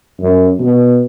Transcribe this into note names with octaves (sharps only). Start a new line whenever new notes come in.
F#2
B2